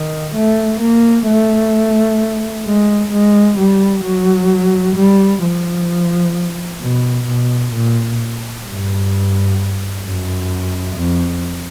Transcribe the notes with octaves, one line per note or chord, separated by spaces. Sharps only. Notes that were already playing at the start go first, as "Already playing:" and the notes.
Already playing: D#3
A3
A#3
A3
G#3
G#3
G3
F#3
G3
F3
B2
B2
A#2
G2
F#2
F2